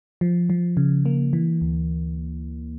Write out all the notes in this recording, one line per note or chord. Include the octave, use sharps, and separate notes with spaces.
F3
F3
C#3
A#3
E3
D2